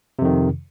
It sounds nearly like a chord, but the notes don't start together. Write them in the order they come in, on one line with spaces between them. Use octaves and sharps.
C3 F2 D#3